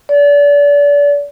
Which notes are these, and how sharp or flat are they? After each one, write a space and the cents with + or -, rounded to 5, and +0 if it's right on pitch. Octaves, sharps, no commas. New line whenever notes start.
D5 -35